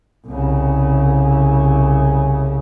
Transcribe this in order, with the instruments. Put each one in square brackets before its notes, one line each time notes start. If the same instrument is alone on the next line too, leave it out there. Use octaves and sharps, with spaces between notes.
[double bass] C2 C#3